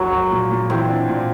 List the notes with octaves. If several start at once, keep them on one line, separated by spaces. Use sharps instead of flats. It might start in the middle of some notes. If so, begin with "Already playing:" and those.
Already playing: F#1 F#3
F#1
A#2
A#2
E3 C4
D4
A#2